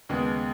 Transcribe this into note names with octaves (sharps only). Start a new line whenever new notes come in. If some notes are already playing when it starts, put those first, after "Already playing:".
D#2 C#3 G#3 B3